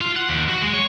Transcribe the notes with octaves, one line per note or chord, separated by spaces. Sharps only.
F4
F#5
D#2
F#4
G#3
C#5